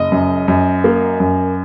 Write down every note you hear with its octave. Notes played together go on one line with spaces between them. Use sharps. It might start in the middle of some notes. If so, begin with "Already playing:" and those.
Already playing: F#1 D#5
F#2
F#2
A#3
F#2